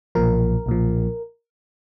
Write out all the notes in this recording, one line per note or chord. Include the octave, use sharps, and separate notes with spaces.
B1 A#2 F3 A#4
B1 A#2 F3